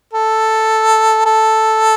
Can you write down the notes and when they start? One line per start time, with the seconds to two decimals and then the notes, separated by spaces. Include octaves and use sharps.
0.14 A4
1.26 A4